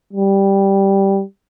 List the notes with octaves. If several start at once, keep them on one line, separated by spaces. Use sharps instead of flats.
G3